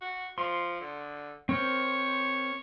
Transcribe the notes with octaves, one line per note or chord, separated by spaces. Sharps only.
F#4
F3 C6
D3
C4 A#4 C5 C#5